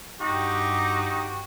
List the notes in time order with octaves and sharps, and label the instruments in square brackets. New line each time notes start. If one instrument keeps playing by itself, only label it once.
[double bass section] G2 [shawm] D#4 [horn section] F#4 G4